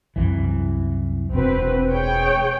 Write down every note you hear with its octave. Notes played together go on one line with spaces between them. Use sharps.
C2 F#2 E3
E1 C4 F#4 B4
G#4 C#5 G5